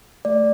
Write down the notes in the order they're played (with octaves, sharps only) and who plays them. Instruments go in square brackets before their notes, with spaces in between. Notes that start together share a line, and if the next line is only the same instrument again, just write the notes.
[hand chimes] A3 D5